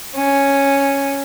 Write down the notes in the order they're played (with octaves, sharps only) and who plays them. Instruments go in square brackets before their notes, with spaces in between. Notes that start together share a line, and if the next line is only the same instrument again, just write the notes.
[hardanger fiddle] C#4